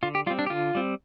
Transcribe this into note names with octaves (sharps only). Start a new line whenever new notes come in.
D3 F4
G4
G3 C4 F4
D4
G4
D3 F4
G3 C4